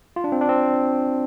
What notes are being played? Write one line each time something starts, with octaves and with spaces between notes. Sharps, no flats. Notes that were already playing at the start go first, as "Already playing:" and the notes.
F4
D4
C4
D4
C4